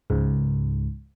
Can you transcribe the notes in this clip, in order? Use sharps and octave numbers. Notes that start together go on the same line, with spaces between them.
C#2 G#2